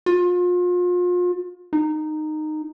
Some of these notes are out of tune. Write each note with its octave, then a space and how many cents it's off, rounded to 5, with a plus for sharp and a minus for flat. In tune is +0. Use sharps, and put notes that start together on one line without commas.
F4 +35
D#4 -15